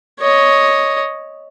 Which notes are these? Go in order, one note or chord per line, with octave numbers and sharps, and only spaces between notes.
C#5 D#5